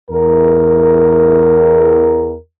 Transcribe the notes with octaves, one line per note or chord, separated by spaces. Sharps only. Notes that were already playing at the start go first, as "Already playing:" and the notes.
E2 A#4